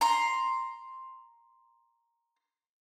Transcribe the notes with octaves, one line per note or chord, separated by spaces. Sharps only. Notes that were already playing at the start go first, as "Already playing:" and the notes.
A#5 C6